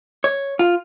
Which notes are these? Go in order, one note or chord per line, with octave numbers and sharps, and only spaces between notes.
C#5
F4